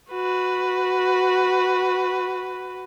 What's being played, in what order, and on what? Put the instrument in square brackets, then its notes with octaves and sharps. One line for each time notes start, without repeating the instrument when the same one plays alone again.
[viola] F#4 B4